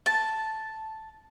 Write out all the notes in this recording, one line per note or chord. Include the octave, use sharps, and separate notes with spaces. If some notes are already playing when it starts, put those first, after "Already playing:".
A5